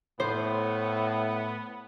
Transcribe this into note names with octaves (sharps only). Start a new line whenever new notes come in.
A2 B3 C5